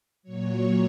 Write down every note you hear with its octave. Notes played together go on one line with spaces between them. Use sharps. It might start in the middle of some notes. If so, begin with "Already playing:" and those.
A#2 F#3 C#5